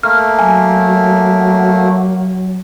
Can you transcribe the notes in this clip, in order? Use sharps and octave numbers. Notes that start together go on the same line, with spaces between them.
A3 A#3 F6
F#3 G#5